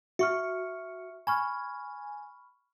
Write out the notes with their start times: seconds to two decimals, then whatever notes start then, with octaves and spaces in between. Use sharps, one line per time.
0.19 F#4 E5 C#6 F6
1.27 G#5 B5 C#6 F6